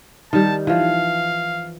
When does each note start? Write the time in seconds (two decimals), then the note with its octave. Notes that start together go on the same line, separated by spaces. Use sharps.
0.33 D#3 G3 A5
0.67 E3 F3 F5